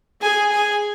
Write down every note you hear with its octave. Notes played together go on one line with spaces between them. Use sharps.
G#4 G#5
G#5